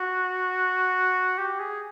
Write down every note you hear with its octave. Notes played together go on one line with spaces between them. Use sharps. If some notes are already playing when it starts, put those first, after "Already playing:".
Already playing: F#4
G4
G#4